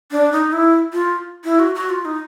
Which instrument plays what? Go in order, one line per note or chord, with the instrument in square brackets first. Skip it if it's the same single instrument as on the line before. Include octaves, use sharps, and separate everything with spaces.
[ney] D4
D#4
E4
F4
E4
F#4
F#4
F4
D#4